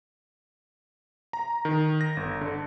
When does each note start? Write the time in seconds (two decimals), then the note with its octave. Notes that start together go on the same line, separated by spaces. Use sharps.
1.33 A#5
1.65 D#3
2.01 A#6
2.17 G1
2.41 D3